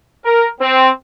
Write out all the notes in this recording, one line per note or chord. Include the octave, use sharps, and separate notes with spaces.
A#4
C4